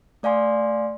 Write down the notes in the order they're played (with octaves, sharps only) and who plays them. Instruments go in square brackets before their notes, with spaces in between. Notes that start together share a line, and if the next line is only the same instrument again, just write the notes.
[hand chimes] A3 D5 F5 G#5 C6